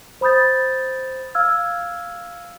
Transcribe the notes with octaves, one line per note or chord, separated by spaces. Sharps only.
C5 B5 D#6 G6 A6
F5 E6 F6 G#6